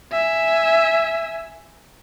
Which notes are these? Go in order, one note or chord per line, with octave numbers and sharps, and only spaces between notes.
E5 G#5